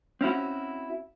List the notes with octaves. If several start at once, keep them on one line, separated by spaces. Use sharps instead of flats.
C4 C#4 E4 F#4